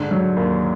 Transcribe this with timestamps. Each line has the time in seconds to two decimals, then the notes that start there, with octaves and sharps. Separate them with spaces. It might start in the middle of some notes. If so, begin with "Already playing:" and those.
Already playing: G#2 D3
0.11 F#3
0.36 D#2